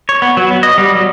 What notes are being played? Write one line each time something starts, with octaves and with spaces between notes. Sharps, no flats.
C#5
B3
F#3
B3
D#5
G3
F#3